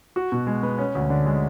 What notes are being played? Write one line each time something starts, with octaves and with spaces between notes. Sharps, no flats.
F#4
B2
G#3
B3
C#4
D2
D3
G#3